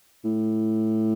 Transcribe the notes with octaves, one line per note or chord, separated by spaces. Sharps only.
A2